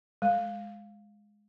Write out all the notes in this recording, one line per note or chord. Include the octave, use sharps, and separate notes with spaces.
G#3